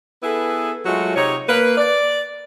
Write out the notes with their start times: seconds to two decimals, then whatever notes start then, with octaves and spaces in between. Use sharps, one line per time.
0.23 B3 E4 G#4 A4 B4
0.86 F#3 G#3 A3 F4 F#4
1.16 C3 D#4 C#5
1.49 A#3 B4
1.78 D5